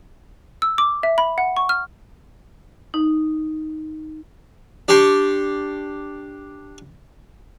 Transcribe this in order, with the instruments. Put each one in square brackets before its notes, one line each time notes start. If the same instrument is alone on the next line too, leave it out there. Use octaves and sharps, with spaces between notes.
[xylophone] E6
D6
E5
B5
F#5
C#6
F6
[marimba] D#4
[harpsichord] D4 G4 C6 C#6